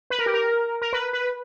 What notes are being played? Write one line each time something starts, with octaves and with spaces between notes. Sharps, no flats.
B4
A#4
G4
A#4
A#4
B4
B4